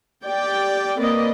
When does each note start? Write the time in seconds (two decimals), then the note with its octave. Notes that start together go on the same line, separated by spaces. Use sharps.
0.25 G4 D5 G5
0.99 A#3 C4 B4 D5 D#5